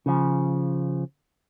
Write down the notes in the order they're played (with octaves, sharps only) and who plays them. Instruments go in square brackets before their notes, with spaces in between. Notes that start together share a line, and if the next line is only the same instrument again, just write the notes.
[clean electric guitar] C#3 F3